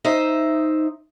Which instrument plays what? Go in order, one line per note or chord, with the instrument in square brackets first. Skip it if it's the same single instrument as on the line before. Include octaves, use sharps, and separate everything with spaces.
[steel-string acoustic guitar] D#4 C5 E5